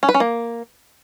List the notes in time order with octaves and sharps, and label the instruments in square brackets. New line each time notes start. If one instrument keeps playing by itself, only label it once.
[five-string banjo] C#4
B4
C#4
A#3